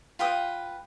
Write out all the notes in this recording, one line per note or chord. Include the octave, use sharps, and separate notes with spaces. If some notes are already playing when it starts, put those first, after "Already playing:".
F4 B4 G5 D#6